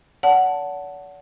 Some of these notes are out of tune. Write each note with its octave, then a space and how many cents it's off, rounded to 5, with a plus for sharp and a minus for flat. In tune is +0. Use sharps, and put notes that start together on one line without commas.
D5 -45 F#5 +0 A5 +0